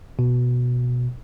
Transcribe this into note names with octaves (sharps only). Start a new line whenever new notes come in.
B2